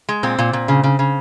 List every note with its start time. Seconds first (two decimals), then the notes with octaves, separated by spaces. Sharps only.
0.09 G#3
0.23 A#2 C4
0.39 A#2
0.53 A#2
0.68 C#3
0.84 C#3
0.99 C#3